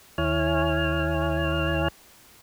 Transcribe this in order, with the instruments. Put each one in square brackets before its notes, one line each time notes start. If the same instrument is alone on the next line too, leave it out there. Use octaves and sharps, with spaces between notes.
[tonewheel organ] D#2 E4 C#5 G#5 F6